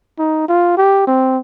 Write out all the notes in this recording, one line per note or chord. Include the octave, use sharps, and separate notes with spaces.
D#4
F4
G4
C4